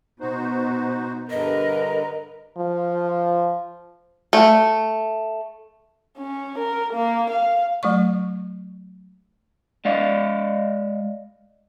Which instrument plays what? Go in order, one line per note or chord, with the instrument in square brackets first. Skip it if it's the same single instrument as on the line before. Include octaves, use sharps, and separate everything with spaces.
[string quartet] B2 [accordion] D#4 F#4 C5
[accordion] G2 D3 [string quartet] A#4 B4 [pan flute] D#5
[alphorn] F3
[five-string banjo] A3
[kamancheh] C#4
A#4
A#3
F5
[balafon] F#3 A3 D5 C#6
[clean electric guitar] G#3 D5 D#5 F5